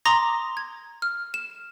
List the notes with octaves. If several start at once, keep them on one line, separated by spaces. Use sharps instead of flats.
A#5 C6 D6 D#6 A#6
G#6
F6
E7